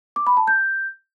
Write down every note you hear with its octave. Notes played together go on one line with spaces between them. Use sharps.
D6
B5
A5
G6